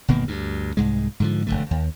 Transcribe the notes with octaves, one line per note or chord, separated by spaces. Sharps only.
G1 B2 D#3 A#3
D2 G2
C2 G#2 G#3
G#2 D3 F3
E1 D#2 D3 A3
D#2